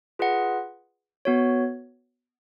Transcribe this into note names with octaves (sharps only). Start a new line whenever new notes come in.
F4 G#4 B4 D#5 F#5
B3 F#4 C#5